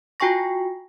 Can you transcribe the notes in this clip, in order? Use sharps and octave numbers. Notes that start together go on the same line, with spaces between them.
F4 F#4 G5 G#5 C#6 A#6